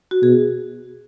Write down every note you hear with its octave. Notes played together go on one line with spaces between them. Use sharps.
F#4
B2 G#4